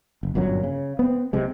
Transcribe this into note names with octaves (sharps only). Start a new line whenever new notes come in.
F#1
G1 F#2 A#2 F#3
C#3
B3 C4
B1 C3 G#3